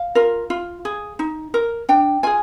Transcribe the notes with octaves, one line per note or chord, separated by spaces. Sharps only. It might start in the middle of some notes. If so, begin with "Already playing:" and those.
Already playing: F5
F4 A#4
F4
G#4
D#4
A#4
D4 G5
F4 G#4 G#5